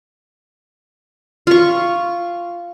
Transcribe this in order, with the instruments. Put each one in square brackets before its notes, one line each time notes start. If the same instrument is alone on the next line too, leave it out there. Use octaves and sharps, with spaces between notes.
[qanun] F4 C#6